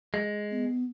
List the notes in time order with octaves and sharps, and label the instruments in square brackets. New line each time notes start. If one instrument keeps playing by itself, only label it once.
[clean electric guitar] G#3
[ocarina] B3